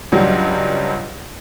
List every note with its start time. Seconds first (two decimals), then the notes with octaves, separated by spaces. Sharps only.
0.12 C#2 G2 F#3 G3